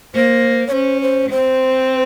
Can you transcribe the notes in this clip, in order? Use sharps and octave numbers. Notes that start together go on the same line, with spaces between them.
A#3 C5
C#5
C#4 C5
C5
C4 C5